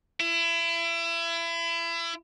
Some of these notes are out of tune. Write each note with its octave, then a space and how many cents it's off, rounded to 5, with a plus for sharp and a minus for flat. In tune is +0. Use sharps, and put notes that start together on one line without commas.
E4 +30